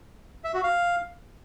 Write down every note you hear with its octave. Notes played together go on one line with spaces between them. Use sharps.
E5
F#4
F5